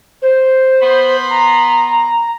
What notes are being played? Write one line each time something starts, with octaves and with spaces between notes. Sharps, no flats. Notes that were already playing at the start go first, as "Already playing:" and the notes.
C5
B3 B5 C6
A#5